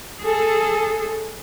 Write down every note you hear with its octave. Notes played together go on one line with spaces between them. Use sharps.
G#4 A4